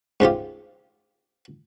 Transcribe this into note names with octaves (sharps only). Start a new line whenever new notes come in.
G#2 C#3 F4 G4